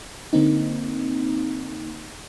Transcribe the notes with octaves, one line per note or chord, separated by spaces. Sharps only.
D3 A#3 C4 D#4